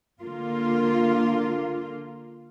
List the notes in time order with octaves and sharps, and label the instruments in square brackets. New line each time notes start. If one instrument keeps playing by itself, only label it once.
[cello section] D3 A#3 F4